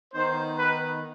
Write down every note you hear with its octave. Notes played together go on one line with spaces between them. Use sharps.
D#3 B3 D#4 C5
B4